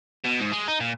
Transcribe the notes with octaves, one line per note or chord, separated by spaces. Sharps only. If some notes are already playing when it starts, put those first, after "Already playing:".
B2
G#2
G#3
D#4
A#2